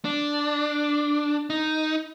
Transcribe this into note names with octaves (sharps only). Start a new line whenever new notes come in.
D4
D#4